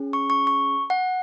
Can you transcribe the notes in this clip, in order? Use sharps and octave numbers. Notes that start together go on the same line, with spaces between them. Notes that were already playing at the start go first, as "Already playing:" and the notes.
Already playing: C#4 G#4
C#6
C#6
C#6
F#5